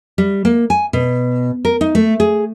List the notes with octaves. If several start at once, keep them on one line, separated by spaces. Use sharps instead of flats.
G3
A#3
G#5
B2
A#4
D#4
A3
G#4